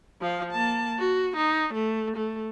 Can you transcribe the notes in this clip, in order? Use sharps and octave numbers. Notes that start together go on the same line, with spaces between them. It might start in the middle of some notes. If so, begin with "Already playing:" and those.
F3 F5
A#3 A5
F#4
D#4
A3
A3